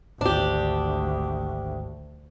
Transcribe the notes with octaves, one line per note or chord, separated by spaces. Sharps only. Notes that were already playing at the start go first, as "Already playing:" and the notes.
G#1 D2 D4 G4